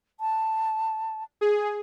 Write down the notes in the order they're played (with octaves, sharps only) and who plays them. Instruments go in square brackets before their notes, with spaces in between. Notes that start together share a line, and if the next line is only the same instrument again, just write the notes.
[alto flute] A5
[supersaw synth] G#4